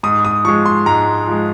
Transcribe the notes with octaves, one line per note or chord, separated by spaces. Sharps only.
G#2 D#6
D#6
F3 G#3 C#6
C6
G#2 A#5
F3 G#3